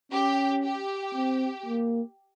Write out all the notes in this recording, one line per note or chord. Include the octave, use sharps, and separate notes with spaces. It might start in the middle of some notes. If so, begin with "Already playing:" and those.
C#4 G4
G4
C4
A#3